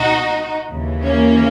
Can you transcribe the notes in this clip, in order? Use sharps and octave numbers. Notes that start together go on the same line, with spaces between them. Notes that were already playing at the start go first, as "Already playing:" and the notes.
Already playing: C#2 B2 D#4 F#4
D#2 C#3 E3
A#3 C#4